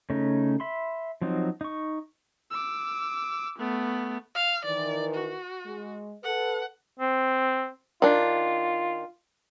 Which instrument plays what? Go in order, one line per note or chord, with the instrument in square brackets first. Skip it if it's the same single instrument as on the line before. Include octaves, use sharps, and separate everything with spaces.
[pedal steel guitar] C#3 A3 C#4 D#4
E5 B5 C6
F3 F#3 C4 D#4
D#4 C#6
[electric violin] D6 E6
A3 B3
[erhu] F5
[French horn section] D#3 E3 [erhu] D5
[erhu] F#4
[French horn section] G#3
[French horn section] A4 B4 [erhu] F#5
[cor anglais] C4
[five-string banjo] D#3 D4 [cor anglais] F4